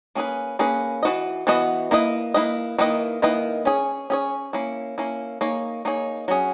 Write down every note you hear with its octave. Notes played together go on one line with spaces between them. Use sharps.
A#3 C#4 G#4 B4
A#3 C#4 G#4 B4
E3 B3 F#4 B4 D#5
E3 B3 F#4 B4 D#5
A#3 E4 B4 D#5
A#3 E4 B4 D#5
D#3 A#3 E4 B4 D#5
D#3 A#3 E4 B4 D#5
C#4 G#4 C#5
C#4 G#4 C#5
A#3 C#4 E4
A#3 C#4 E4
A#3 D#4 G#4 C#5
A#3 D#4 G#4 C#5
F#3 C#4 G#4